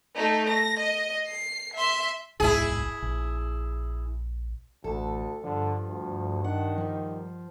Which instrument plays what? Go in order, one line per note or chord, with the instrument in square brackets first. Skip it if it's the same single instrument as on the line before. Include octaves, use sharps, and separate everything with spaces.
[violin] A3 D#4
A#6
D#5
C7
E5 C6
[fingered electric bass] D1 B1 G#2 [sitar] E4 G#4
[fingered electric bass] A#1
[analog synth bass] A1 [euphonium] D2 [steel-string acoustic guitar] A4
[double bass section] G2 [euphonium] D3 [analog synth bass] F3
[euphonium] D2
[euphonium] D#3 [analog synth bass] D4 [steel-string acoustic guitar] F#5
[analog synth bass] F3 [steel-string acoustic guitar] G3